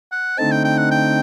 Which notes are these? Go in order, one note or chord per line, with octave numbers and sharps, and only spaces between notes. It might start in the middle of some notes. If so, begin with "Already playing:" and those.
F#5
D3 A3 C4 D#4 A5
G5
G5
F#5
G5